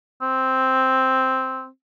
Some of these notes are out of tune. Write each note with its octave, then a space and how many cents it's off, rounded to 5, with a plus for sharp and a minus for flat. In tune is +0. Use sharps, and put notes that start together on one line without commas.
C4 +0